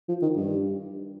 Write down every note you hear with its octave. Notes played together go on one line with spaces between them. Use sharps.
F3
D#3
G2